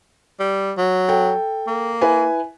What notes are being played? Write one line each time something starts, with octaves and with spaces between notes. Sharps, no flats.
G3
F#3
A4 G5
A#3
E4 B4 G#5